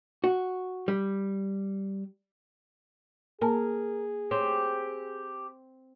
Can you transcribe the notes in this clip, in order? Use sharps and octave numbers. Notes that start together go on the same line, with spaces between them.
F#4
G3
A#3 G#4 A#4 G#5 A5
C4 G4 C#5